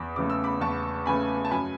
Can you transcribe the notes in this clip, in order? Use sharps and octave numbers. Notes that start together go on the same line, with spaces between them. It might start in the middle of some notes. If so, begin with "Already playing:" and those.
Already playing: E2 B5 D6
C#3 E3 A3 D6
E6
B5 D6
E2 A5 C#6
C#3 E3 A3 G#5 B5
A5
F#2 G#5 B5